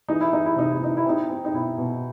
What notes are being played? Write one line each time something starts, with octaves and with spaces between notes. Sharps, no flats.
E3 D#4
E4
E3 D#4
E4
C3 D#4
E4
E3 D#4
E4
C4 D#4
C4
D#4
B2 E4
B2